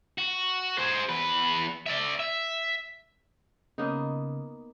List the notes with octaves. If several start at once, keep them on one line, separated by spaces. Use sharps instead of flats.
F#4
G#4 C5
E2 B4
D5 E5
E5
C#3 A#3 B3 D#4